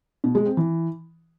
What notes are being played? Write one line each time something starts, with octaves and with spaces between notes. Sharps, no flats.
B2
G#3
C4
E3